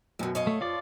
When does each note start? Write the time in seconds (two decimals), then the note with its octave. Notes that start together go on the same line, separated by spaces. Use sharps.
0.19 F#2 B2 D#3 F#3
0.35 C#5 D#5 F5
0.47 A3
0.61 F2 F3 F4 D5